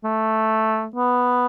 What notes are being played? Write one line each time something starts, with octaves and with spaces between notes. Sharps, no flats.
A3
B3